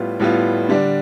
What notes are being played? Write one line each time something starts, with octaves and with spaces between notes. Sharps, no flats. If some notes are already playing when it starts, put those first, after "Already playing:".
Already playing: A2 G3 B3 F4
A2 G3 B3 F4
D3 G3 D4